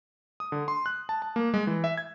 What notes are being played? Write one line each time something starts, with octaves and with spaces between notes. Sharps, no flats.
D#6
D3
C6
F#6
A5
A5
A#3
G#3
E3
E5
G#6